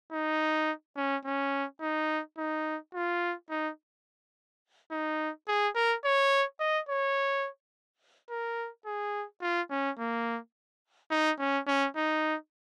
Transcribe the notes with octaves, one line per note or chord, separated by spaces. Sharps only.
D#4
C#4
C#4
D#4
D#4
F4
D#4
D#4
G#4
A#4
C#5
D#5
C#5
A#4
G#4
F4
C#4
A#3
D#4
C#4
C#4
D#4